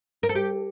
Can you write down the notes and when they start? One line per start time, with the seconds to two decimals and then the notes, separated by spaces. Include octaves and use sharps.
0.23 A#4
0.29 A4
0.35 G4